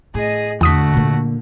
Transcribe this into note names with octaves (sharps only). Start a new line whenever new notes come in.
A2 G#4 D#5
E2 D3 A3 F#4 D#6 B6
A#2 A#3